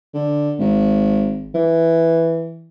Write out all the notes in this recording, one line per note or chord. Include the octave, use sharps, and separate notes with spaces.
D3
G#1
E3